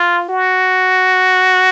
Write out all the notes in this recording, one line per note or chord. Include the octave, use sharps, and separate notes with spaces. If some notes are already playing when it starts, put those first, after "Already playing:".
Already playing: F4
F#4